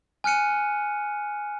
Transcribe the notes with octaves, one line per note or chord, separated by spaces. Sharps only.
G#5 F6 F#6 C#7 D#7